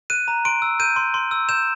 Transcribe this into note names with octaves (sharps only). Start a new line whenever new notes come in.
F#6 D#7
A#5
C6 D7
E6
G6 D#7
C6
C6
E6
G6 E7